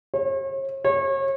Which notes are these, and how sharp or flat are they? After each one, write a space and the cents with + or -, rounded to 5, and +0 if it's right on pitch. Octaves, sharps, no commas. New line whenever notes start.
C#5 -45
C#5 -35